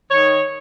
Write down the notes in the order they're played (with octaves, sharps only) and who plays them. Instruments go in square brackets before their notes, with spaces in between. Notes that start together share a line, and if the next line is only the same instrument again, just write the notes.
[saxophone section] D#3 C#5